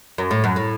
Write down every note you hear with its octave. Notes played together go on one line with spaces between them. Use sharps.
F#2
A2
F#2
A2